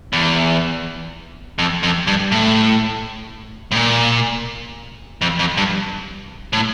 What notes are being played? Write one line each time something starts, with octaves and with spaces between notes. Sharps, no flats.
E2
F2
F2
G2
A2
A2
A#2
F2
F2
G2
A2